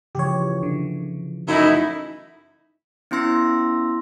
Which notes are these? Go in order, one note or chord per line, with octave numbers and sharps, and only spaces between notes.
C#3 E3 F3 G4 C#5
D3
F#2 A3 D#4 E4
B3 C#4 E4 C6 E6 A#6